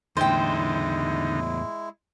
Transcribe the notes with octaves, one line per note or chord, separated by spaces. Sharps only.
E2 A2 D3 G#3 D#4 E4 C5 G5